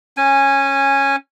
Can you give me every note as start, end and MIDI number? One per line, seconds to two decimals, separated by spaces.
0.17 1.16 61
0.17 1.16 80